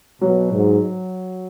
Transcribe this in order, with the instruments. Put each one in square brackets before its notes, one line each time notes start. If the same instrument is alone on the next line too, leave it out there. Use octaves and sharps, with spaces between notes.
[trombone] B2 [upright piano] F#3
[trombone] G#2